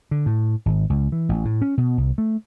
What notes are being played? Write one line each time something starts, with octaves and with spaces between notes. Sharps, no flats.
D3
A2
G#1
C#2
E3
A1
A2
C#4
B2
C2
A3